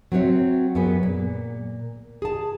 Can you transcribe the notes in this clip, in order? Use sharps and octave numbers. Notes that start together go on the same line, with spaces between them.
F#3 C4 F#4 C#5 E5
F#2 F#3 B3 G#4 B4
A#2
G#4 A5